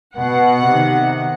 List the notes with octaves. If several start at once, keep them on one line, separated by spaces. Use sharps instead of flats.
B2 F#5
C3 D#3